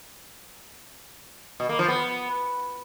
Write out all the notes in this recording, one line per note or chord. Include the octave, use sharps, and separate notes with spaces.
B2
A#3
F3
B3